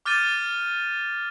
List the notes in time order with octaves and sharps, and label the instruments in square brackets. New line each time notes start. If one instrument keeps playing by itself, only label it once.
[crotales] D6 F6 G6 A6 D#7